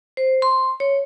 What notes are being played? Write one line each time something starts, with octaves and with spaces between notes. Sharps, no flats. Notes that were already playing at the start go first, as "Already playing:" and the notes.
C5
C6
C#5